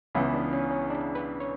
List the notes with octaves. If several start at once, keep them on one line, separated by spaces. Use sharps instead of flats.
C#2 C#3 E3 B3 C#4 E4
D4
C#4
C#4
D4
B4
C#5